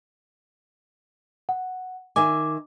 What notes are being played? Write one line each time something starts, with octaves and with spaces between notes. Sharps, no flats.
F#5
D#3 E5 G#5 D6